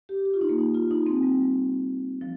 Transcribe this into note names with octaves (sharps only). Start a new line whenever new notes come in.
G4
G4
F4
D#4
A#3
D#4
F4
D#4
C4
G3
F3